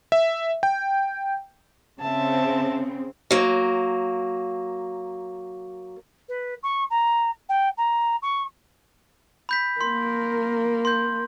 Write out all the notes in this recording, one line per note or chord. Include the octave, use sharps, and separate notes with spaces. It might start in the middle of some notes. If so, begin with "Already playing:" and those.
E5
G5
C#3 C4 E5 A5
F#3 A#3
B4
C#6
A#5
G5
A#5
C#6
B5 G6 B6
A#3 A#4 C6
C6 G6